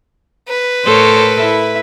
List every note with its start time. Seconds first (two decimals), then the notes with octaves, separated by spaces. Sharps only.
0.49 B4
0.84 A2 A4 A#4 C5 C#5
1.39 E4 E5